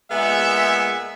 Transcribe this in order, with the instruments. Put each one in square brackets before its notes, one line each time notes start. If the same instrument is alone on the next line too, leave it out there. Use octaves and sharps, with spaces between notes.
[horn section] A#2 G#3 B3 E5